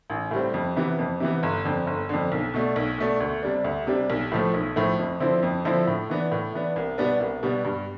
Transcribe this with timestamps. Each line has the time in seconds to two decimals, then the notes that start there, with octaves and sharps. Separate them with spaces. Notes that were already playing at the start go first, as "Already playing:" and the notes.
0.10 A1
0.31 A2 G3 C4
0.54 F2
0.76 C3 E3 B3
0.98 F2
1.20 C3 E3 B3
1.43 G1
1.65 F2 D3
1.87 G1
2.09 F2 D3
2.32 B1
2.54 B2 A3 D4
2.76 B1
2.98 B2 A3 D4
3.20 D2
3.42 C3 G3 D4
3.64 D2
3.87 C3 G3 D4
4.10 B1
4.32 A2 F3 A3
4.54 B1
4.76 A2 F3 A3
4.99 F2
5.20 D3 F3 C4 E4
5.42 F2
5.65 D3 F3 C4 E4
5.87 A2
6.10 E3 B3 D4
6.32 A2
6.54 E3 B3 D4
6.76 C2
6.98 B2 G3 B3 D4
7.20 C2
7.43 B2 G3 B3 D4
7.65 G2